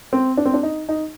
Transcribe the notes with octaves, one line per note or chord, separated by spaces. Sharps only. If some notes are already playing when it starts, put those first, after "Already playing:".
C4
D4
C4
D4
D#4
D#4